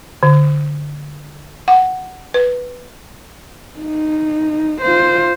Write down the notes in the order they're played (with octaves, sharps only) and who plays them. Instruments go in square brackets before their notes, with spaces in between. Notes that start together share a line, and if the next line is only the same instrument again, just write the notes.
[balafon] D3
F#5
B4
[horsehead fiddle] D#4
F4 C5